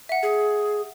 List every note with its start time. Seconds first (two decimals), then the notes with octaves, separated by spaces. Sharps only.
0.09 E5 F#5
0.23 G#4